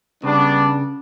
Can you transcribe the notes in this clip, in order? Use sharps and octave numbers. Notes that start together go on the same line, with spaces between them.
C#3 G3 B3 D4